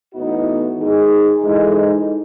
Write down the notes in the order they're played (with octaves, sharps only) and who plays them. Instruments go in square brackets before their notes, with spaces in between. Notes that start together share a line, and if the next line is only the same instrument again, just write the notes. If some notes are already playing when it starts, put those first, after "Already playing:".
[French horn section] A2 E3 B3 D#4 F#4
D#3 G#3 D#4 G#4
G#2 E3 G#3 D#4 A4